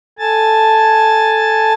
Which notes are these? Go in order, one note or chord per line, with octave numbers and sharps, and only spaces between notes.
A4 G#5 A5 A6